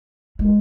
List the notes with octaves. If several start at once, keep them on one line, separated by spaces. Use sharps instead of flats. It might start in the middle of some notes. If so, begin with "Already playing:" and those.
G#3